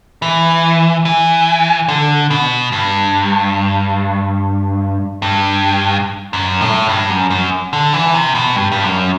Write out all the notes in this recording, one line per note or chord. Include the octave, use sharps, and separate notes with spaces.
E3
E3
D3
B2
G2
G2
F#2
A2
G2
F#2
F#2
D3
E3
C3
B2
G2
G2
F#2